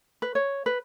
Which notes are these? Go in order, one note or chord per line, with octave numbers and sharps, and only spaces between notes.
B4
C#5
B4